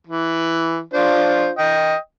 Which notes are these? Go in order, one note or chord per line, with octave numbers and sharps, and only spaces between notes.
E3
D4 F4 C5
D#5 G5